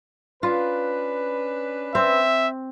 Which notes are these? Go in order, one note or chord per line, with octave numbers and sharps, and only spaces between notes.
C#4 D4 F4 B4
C4 E5